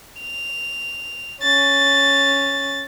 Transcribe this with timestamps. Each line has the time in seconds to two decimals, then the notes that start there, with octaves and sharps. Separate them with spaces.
0.21 F7
1.42 C#4 A6